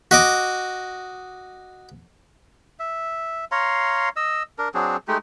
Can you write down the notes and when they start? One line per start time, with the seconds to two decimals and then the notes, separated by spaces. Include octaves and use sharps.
0.11 F#4 D#5 D6
2.80 E5
3.52 C#5 F5 A#5 C6
4.16 D#5 E6
4.58 D4 A#4
4.74 F#3 C4 D4 G#4
5.08 G#3 A3 D#4 G4